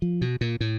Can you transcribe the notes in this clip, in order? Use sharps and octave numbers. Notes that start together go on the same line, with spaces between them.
F3
B2
A#2
A2